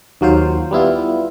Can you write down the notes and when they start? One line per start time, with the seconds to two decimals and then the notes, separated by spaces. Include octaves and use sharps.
0.21 D#2 F#3 F4 C5
0.71 G3 B3 E4 F4